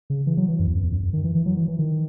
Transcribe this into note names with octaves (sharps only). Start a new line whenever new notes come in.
C#3
E3
F#3
E3
F#2
E2
F#2
E2
F#2
F#2
D#3
E3
E3
F#3
E3
E3
D#3